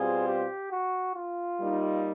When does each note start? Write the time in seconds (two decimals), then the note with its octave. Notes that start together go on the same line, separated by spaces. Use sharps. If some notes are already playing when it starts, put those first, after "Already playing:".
Already playing: B2 G3 C4 F4 G#4
0.27 G4
0.71 F#4
1.15 F4
1.59 G3 A#3 D#4